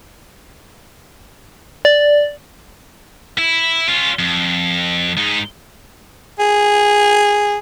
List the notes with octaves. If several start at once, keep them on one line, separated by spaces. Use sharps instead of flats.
D5
E4
C#4 F4
F2
G#2 D#4
G#4